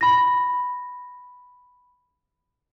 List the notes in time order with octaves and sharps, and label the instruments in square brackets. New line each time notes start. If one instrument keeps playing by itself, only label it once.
[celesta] B5 A#6